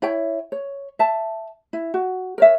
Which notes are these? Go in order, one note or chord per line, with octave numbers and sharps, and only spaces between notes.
E4 C#5 G5
C#5
E5 A5
E4
F#4
A#4 C#5 E5